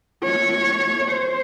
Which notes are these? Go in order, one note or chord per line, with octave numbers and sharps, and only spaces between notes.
C#5
C5